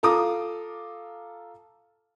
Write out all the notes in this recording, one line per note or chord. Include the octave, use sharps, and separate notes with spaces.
F4 A4 A#5 D6 D#6